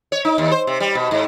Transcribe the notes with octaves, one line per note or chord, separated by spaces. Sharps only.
C#5
D#4
D#2
C5
C3
G3
B2
G#2